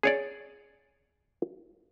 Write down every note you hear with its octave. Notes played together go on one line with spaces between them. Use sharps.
G#4 C#5 D5